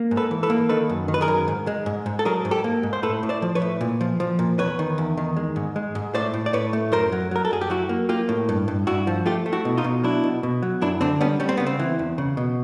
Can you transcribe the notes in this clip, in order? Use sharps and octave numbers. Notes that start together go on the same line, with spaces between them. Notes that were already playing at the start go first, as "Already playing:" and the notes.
Already playing: A#3
G#2
A4 B4
E3
A4 B4
A#3
D#3 A4 B4
F#2
D#3
B4
G#4 A#4
F#2
G#2
G#3
G#2
G#2
A4
F#3 G#4 A#4
G#2
G4 A4
A#3
G#2
C5
A2 A4 B4
A2
C5 D5
F3
B4 C#5
A2
A#2
F3
F3
A#2
E2 B4 C#5
D#3
E2
D#3
G#3
G#2
G#3
G#2
A2 C5 D5
A2
D5
A2 B4 C#5
A3
F#2 A#4 C5
F#3
F#3 A#4
A4
F#2 G#4
G4
F#3 E4 F#4
A#3
A#3 F4 G4
A2
G2
G2
G2 E4 F#4
F3
A3 F4 G4
A3
E4 F#4
B2
D#4 F4
B2
F#3 D4 E4
B2
B2
F#3
F#2 D4 E4
D3 C4 D4
G3 B3 C#4
G3 C#4
C4
C#3 B3
C4
E3
E2
C#3
B2